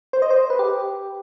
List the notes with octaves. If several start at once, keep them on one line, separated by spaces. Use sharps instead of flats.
C5
D#5
C5
B4
G4